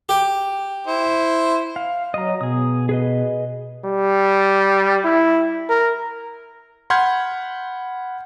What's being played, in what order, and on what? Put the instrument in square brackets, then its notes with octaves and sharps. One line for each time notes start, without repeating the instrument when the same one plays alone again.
[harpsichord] G4
[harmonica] E4 C5
[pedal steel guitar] F5
[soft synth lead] F#3 [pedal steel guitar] D#5 A#5
[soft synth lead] B2 [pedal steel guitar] G#4 D#6
[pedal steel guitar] G#4 B4 D#5
[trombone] G3
E4
A#4
[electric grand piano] F#5 B5 C6 F6 G6 G#6